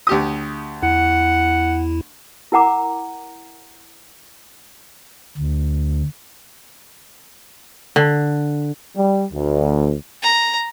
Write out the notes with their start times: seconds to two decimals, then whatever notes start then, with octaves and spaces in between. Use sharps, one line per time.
0.07 D2 G4 D#6
0.83 E2 E4 F#5
2.52 E4 A#4 F#5 A#5 D6
5.37 D2
7.96 D3
8.97 G3
9.33 D2
10.22 A#5